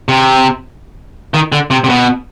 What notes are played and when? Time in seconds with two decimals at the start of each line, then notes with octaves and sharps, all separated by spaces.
0.09 C3
1.34 D#3
1.52 D3
1.70 C3
1.84 C3
1.89 B2